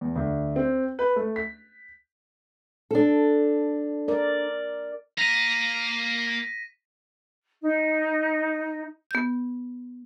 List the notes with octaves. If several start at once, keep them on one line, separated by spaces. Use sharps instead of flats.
E2
D2
C4
B4
A3
B6
D4 A4
A#4 D5
A#3 A#5 A#6 B6 D#7
D#4
B3 G6